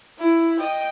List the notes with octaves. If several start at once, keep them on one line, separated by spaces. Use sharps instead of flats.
E4
D#5 G5